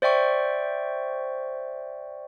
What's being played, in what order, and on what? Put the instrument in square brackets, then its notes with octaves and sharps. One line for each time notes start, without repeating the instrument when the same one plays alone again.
[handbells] C5 D5 E5 G5 C#6